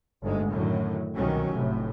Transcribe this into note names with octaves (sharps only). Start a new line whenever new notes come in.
G1 D2 G#2 G#3
F#2 A2 D3 D#3 F#3
C2 B2 D#3 F#3 C#4
F1 A2 C3